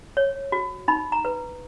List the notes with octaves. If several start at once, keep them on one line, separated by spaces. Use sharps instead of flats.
C#5
F#4
D#4 B5
A#5
B4